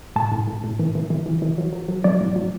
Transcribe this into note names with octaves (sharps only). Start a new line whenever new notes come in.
A2 A5
A2
A2
A2
E3
E3
E3
E3
E3
F#3
F#3
F#3
F#3 D5
A2
F#3